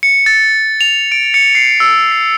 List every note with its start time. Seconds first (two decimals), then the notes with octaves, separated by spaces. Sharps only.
0.03 C#7
0.26 A6
0.81 F7
1.12 D7
1.34 C#7
1.55 C7
1.80 E6
2.12 C7